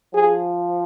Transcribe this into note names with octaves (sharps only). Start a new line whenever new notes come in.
F3 G#4